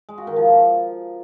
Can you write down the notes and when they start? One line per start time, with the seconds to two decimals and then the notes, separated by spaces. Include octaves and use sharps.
0.09 G#3
0.18 F#4
0.27 D#3
0.36 F3